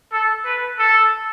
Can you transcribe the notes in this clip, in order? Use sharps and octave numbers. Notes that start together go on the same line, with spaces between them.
A4
B4
A4